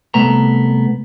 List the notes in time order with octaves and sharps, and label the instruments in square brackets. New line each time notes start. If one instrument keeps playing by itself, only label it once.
[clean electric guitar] C2 A3 B3 A#5